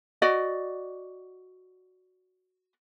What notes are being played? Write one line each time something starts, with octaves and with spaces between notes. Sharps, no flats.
F#4 D5 D#5